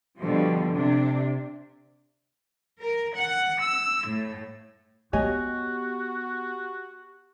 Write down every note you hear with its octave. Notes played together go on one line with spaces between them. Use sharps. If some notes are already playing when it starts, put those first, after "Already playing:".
B2 D3 F3 G3
C3 D4
A#4
F#5
E6
A2
B3 F#4 G4 C#5 D#5 G#5